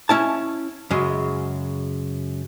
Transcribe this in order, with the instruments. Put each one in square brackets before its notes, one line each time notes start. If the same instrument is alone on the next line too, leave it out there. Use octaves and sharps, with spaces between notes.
[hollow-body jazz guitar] C#4 E4 A5
F#2 C#3 G#3